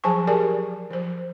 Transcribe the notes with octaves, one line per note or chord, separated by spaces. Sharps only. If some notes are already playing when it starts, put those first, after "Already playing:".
F3 F#3 G#4 G#5 A5 C#6
G4 G#4 A#4 D5 G#5
F3 C5